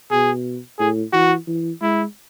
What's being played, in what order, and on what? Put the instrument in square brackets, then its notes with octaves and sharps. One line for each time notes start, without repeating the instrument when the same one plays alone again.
[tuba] B2 [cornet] G#4
[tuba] A2 [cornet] G#4
[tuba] E3 [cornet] F#4
[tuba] E3
[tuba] G#3 [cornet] E4